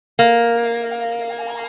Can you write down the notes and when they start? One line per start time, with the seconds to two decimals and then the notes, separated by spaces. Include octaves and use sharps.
0.19 A#3